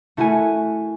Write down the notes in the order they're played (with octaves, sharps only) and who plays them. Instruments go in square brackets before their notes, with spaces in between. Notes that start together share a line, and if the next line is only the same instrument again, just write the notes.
[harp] A3 E4 F#4 A#4 G#5